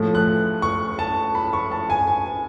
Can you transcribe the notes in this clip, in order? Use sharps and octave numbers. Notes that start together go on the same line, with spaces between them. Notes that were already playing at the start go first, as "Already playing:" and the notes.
Already playing: A2 F3 A3
F#6
C#6
A5
B5
C#6
A5
G#5
G#5